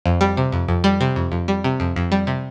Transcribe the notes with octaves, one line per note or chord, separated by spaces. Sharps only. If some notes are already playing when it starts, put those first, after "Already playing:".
F2
G3
C3
F2
F2
G3
C3
F2
F2
G3
C3
F2
F2
G3
C3